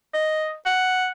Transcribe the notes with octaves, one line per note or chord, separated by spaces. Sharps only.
D#5
F#5